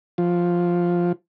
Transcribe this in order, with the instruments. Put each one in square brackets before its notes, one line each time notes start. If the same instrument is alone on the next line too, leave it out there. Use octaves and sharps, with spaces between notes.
[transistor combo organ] F3